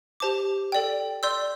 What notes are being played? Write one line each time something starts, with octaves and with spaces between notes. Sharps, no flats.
G4 C5 A5 D6
A4 D5 G5
D5 C6 E6 G6